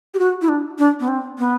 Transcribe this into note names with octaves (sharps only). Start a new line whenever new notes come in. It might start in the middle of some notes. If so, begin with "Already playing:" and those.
G4
F#4
E4
D4
D4
B3
C4
B3